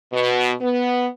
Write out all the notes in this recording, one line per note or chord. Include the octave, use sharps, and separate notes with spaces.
B2
B3